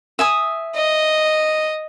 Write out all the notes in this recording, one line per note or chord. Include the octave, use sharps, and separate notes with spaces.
E5 G#5 D#6
D#5